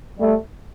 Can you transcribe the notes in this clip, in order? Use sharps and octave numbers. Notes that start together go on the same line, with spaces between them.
G3 A3